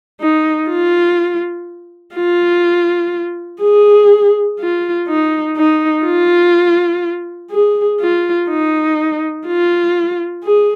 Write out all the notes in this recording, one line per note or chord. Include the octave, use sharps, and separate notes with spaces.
D#4
F4
F4
G#4
F4
D#4
D#4
F4
G#4
F4
D#4
F4
G#4